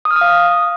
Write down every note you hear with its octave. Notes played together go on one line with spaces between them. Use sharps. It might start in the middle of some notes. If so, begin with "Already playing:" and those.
D#6
F6
D#6
F5